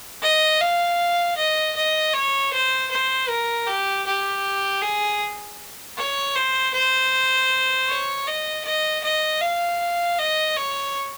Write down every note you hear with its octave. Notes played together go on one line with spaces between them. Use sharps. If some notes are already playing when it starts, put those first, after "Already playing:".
D#5
F5
D#5
D#5
C#5
C5
C5
A#4
G4
G4
G#4
C#5
C5
C5
C#5
D#5
D#5
D#5
F5
D#5
C#5